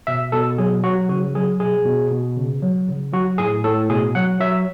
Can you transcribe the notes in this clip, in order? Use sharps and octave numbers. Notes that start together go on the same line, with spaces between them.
B2 E5
B2 A4
F#3 G#4
F#3 F#4
C#3 F#4
F#3 G#4
B2 G#4
B2
B2
C#3
F#3
C#3
F#3 F#4
A2 G#4
A2 A4
B2 G#4
F#3 F#5
F#3 E5